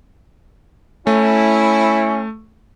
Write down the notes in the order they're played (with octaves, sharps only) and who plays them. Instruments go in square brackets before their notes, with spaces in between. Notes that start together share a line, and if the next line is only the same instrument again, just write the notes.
[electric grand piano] A3 [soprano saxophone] C#4 [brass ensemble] E4